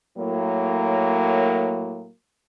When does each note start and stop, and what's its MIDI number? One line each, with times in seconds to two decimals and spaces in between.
0.17 2.09 45
0.17 2.09 54
0.17 2.09 58